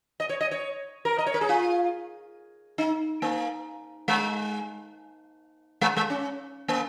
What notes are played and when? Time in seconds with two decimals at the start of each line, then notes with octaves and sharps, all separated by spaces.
0.20 D#5
0.29 C#5
0.41 D#5
0.51 C#5
1.05 A#4
1.18 D#5
1.26 C#5
1.34 A#4
1.41 G#4
1.49 F4
2.78 D#4
3.22 A#3
4.08 G#3
5.81 G#3
5.97 G#3
6.10 C#4
6.68 A#3